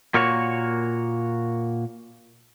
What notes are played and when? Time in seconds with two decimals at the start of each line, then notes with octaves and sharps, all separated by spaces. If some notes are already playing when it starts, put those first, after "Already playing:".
0.14 A#2 A#3 F#4 C#5